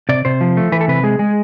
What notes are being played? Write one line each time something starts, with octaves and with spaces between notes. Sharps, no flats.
C3 D5
C3 C5
F3
A3
E3 B4
A4
C3 B4
G#3 G#4
G#3